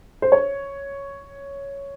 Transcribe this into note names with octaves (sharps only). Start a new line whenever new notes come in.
C5
C#5